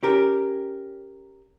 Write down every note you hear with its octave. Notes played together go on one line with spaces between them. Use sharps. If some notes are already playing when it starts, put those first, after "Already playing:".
C#4 G4 A#4